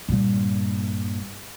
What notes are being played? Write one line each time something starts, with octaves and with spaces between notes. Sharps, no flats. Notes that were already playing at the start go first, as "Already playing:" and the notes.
G2 A#2